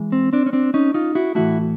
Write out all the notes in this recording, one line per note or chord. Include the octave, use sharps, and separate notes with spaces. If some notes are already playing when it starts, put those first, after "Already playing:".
Already playing: E3 G#3
C4
C4 D4
C#4
C4 D4
C#4 D#4
D#4 F4
E4 F#4
A2 E3 A3 E4 F#4